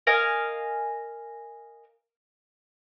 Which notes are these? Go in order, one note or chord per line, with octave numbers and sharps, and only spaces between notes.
A#4 D#5 F5 G#5